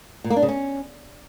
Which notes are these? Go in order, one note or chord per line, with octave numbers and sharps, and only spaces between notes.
A#2
A#3
D4
C#3
C#4